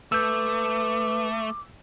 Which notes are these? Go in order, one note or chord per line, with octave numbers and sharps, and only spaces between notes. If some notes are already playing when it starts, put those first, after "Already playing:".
A3 B4 D6 E6 G6